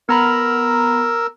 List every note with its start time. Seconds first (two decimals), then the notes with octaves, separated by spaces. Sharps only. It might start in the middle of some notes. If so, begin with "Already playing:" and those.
0.09 B3 A#4 A#5 B5 E6